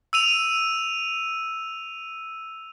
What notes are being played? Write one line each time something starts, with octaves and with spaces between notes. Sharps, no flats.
E6 D#7 F7